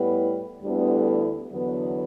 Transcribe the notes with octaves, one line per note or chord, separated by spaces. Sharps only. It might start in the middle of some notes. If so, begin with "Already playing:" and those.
Already playing: A2 G3 B3 E4 B4
D2 D3 G3 B3 E4
E2 D3 F#3 B3